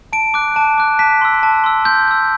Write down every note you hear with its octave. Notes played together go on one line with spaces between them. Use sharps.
A5 D7
D6 F#6
A5
D6 F#6
A5 B6
C6 E6
A5
C6 E6
C6 G6
E6 G6